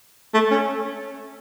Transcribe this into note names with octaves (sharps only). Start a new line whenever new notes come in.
A3
C#4